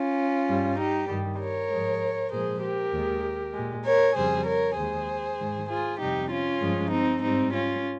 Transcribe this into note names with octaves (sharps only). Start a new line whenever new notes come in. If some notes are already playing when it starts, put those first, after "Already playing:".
Already playing: C#4 F4
G2 G3
D#4 G4
G2 D#3 G3
A#4 C#5
G#2 F3 G#3
A#2 F3 G#3 G#4 C5
G4 A#4
D#2 D#3 G#3
A#2 G#3
A#4 C#5
F2 C#3 G3 G#4 C5
A#4 C#5
D#2 D#3 G#3 G#4 C5
G#2 D#3 G#3
F4 G#4
F2 C3 G3 D#4 G4
C#4 F4
G2 F3 G#3
C4 D#4
G#2 G3 C4 D#4
C#4 F4